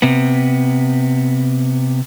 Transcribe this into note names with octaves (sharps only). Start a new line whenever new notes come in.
C3 B3